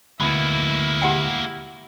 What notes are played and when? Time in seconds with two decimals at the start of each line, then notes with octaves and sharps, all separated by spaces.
0.21 D2 G#3 A#3 B3 E4 B5
1.02 G4 F#5 G5